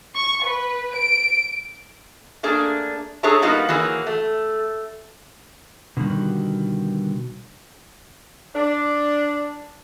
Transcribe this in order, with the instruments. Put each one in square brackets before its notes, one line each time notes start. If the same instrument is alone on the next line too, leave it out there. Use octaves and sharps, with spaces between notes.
[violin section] C#6
B4
D7
[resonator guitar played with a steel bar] A3 A#3 D4 G#4
D4 G#4 A4 C#5 E5 A#5
G3 A#3 B3 D#4 F4 F#4
E3 F#3 A#3 G#4
A3
[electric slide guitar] B2 D3 D#3 F3 G3 F#4
[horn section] D4